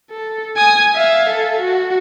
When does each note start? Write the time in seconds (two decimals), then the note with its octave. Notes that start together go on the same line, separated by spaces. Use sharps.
0.10 A4
0.56 G#5 D#6
0.95 E5 F5
1.29 A4
1.60 F#4